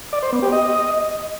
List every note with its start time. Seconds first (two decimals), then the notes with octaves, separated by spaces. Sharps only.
0.13 D5
0.23 C5
0.33 B3
0.42 G4
0.52 D#5